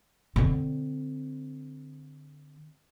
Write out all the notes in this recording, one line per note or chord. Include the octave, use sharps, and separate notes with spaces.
D3 C4